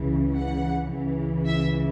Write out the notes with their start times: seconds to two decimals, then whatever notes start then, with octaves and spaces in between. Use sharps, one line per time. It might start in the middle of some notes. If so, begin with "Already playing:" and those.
Already playing: C#2 C#3 E3
0.35 F#5
0.91 C#2 C#3 E3
1.46 E5